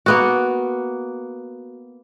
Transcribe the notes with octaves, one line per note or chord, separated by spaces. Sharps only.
A#3 B3 F#4